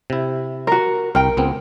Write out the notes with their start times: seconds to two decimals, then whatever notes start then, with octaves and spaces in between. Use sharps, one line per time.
0.10 C3 E4
0.67 F#4 A#4
1.15 C2 A#4 G5
1.37 C#2 B3 C4